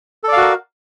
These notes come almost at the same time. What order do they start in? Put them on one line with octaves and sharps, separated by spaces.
A4 D5 F5 F#4 A#4